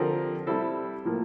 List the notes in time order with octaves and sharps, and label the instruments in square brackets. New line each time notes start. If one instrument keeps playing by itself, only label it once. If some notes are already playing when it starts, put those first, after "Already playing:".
Already playing: [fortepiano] D3 F3 C4 G4 A#4
G3 C4 E4 A4 C5
A2 F3 A#3